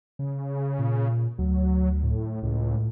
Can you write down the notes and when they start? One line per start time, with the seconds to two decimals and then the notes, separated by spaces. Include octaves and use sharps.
0.19 C#3
0.79 A#2
1.38 D2 F#3
2.03 A2
2.43 C#2 A2